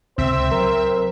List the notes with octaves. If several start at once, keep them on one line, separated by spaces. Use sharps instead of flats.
C#2 C3 C4 C5 E5
F#3 A#4